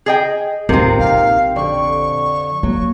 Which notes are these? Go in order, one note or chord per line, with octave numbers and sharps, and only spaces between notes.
G#4 D#5 G5
D#2 A2 C3 C4 D#4 F4 A#4
A#1 F5
F2 D3 D5 C#6
F#3 A#3